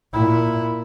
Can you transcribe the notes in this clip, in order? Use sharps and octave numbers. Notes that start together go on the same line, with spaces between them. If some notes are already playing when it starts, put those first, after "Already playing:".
A#2 E4